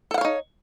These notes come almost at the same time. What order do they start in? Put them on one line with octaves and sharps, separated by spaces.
A4 F#5 F5 C#5 D#4